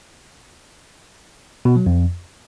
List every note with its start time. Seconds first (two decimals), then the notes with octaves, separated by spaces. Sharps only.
1.65 B2
1.76 F#3
1.86 F2